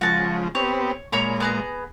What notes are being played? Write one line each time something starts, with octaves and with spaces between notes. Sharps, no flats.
C#3 F3 G#3 F#4 A5
B3 C4 G4 C#5
A#2 G#3 C#5 A#5 B5
B3 G#4 A#5